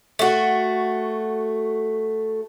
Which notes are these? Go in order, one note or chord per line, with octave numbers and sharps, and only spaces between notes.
A3 F#4